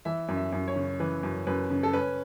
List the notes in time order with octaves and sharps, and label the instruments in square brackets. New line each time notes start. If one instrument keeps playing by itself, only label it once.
[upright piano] E3 E5
F#2
E5
F#2
C#5
C#3
E3 B4
F#2
F#2 B4
C#3
A4
C#4 B4